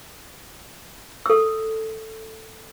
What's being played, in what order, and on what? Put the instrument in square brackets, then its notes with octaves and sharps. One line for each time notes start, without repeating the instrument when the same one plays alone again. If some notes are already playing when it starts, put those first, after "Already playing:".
[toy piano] A4 E6